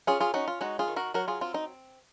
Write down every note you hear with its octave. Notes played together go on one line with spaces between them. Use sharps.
C#4 F4 G#4
F4 G#4
C#4 D#4 F#4
F4
G#3 D#4 F#4
F4 G#4
D#3
F#4 A#4
F#3 F#4 A#4
F4 G#4
C4 F4
D#4